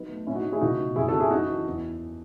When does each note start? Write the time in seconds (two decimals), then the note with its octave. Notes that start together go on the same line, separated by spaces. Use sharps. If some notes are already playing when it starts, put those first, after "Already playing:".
Already playing: F#3 B3 D#4
0.09 A3
0.27 A2 C#4 E4
0.35 D#4 F#4
0.44 A3
0.52 E4 G#4
0.61 C#2 D#4 F#4
0.78 B2
0.96 F#1 E4 G#4
1.08 F#4 A4
1.13 C#3
1.20 E4 G#4
1.31 F#2 D#4 F#4
1.49 E3
1.66 E2